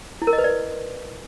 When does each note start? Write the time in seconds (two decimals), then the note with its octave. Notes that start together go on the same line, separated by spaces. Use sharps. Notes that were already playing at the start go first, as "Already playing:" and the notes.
0.22 E4
0.27 A#4
0.33 D#5
0.38 B4
0.44 D5